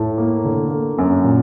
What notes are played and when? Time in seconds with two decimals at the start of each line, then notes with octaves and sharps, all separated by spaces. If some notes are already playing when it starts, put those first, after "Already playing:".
Already playing: A2 A5
0.18 A#3
0.44 D3
0.70 A#3
0.98 F#2
1.24 A#2